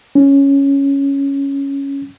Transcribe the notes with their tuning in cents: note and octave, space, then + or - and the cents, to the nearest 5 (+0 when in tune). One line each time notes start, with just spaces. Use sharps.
C#4 +0